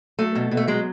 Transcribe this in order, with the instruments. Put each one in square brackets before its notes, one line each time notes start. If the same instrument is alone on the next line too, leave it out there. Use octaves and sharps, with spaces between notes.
[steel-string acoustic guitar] F#3 A3
B2
B2
A3
F#3 G#3